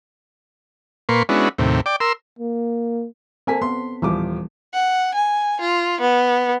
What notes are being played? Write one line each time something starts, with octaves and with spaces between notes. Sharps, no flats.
A#2 A#3 B4 C6 C#6
G#3 B3 C#4 D4 E4 F#4
D#2 A2 C3
D5 G5 D6
A#4 C6 E6
A#3
A#3 C4 A4 G#5 B6
B3 C6
D#1 E3 F3 G3 D6
F#5
G#5
F4
B3